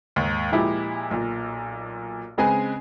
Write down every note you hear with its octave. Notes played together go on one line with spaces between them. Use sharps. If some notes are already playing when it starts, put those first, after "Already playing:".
D#2 G#2
A#2 F3 G#3 E4 G4
B1 A#2
C#3 G#3 C4 G#4 B4 G#5